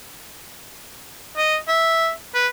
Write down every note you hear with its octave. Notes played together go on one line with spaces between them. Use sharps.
D#5
E5
B4